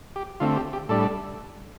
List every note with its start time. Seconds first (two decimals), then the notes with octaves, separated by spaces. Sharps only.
0.16 G4
0.40 D3 A3 C4 F4
0.56 G4
0.73 G4
0.89 A2 G3 D4 A4